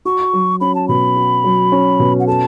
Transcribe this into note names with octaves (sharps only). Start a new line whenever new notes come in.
F#4 C#6
F#3
C#4 B5
A5
B2 B5
F#4
F#3
C#4
B2
F#5
A4 A5